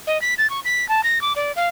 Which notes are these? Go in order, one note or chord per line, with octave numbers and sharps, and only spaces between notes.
D#5
B6
A6
C#6
B6
A5
A#6
D6
D5
F5